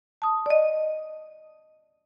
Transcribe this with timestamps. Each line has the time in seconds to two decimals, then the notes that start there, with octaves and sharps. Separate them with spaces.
0.22 A5 D#6
0.46 D5 D#5